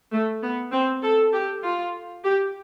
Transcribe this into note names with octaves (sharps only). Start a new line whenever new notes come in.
A3
B3
C4
A4
G4
F4
G4